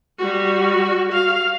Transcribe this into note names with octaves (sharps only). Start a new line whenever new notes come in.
G3 F#4
F5